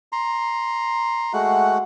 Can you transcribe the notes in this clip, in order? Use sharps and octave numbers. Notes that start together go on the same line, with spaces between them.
A#5 C6
G#3 A3 F#4 F#5